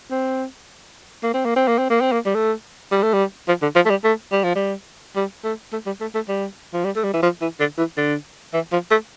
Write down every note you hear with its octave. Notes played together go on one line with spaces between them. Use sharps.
C4
A#3
C4
A#3
C4
A#3
C4
A#3
C4
A#3
G3
A3
G3
A3
G3
F3
D3
F3
A3
G3
A3
G3
F3
G3
G3
A3
A3
G3
A3
A3
G3
F3
G3
A3
G3
E3
F3
E3
D3
E3
D3
E3
F3
A3